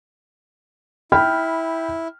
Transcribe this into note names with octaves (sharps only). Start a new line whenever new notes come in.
E4 G5 B5 F6